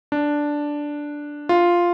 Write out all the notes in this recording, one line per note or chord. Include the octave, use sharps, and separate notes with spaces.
D4
F4